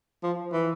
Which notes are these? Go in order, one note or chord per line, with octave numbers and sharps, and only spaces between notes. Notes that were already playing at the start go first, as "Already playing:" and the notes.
F3
E3